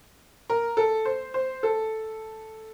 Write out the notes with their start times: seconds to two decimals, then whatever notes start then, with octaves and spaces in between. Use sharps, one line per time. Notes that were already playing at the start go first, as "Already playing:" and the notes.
0.50 A#4
0.77 A4
1.05 C5
1.34 C5
1.63 A4